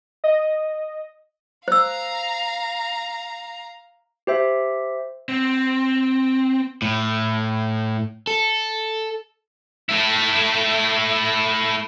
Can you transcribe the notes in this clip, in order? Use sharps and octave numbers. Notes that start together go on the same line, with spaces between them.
D#5
C5 F5 A#5 E6
G4 C5 E5
C4
A2
A4
A3 E4